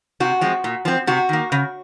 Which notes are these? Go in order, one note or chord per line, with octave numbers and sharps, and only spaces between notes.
C3 F#4
F3 G#3 C4
A#2
F3 C4
C3 F#4
D#3 A#3
C#3